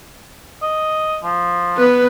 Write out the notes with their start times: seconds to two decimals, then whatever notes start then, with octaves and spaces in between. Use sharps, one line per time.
0.62 D#5
1.23 F3
1.77 B3 B4